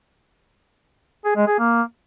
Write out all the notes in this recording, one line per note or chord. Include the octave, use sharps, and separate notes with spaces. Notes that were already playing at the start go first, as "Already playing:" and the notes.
G#4
G#3
G#4
A#3